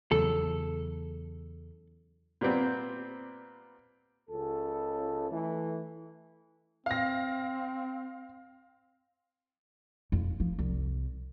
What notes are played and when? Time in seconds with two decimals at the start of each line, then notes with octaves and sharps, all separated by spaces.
0.11 E2 C#3 F#3 A4
2.41 A#2 G3 B3 C4
4.30 C#2 A4
5.31 E3 A3
6.86 C4 F5 A#6
10.12 F2
10.40 F3
10.59 C2